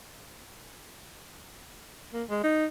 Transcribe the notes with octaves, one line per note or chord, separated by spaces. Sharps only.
A#3
G#3
D#4